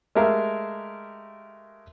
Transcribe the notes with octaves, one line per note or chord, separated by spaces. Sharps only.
G#3 A3 G4 A#4 E5 F5